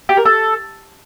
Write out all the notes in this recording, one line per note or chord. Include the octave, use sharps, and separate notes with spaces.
G4
A#4
A4